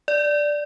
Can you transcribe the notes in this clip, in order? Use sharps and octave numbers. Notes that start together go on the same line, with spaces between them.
D5